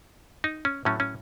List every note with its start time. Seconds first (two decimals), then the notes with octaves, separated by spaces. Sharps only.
0.44 D#4
0.65 C#4
0.85 A2 F#3 A3 C#4
1.00 C#4